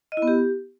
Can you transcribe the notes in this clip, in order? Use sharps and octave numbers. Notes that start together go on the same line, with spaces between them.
D#5
E4
B3
G4